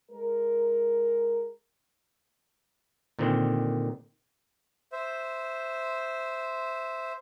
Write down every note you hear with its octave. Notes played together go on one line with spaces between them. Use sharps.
G#3 A#4
A#2 D3 D#3 C4
C5 E5